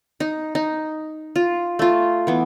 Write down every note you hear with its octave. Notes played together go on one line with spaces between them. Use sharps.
D#4
D#4
F4
A3 F4
E3 B3